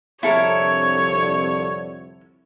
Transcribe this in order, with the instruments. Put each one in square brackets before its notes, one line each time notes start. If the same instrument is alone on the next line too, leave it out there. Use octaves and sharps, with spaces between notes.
[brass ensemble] C2 F2 D3 [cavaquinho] E4 A4 A#4 [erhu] C#5